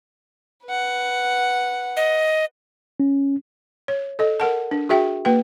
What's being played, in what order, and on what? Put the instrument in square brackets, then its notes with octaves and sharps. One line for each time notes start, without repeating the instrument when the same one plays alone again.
[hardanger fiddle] B4 F#5
[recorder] D#5
[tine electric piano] C#4
[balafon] C#5
A4 D#5
A#4 F#5 A5
D4
F#4 G#4 E5 G5
A#3 B4 G5